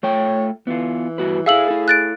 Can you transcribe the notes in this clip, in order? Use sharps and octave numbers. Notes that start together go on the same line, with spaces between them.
A3 F4 C#5 G5
E3 B3 F4
G2 F#4 B4
E4 G#4 A4 E5 F5 E6 F#7
E4 A4
F#6 A6 D7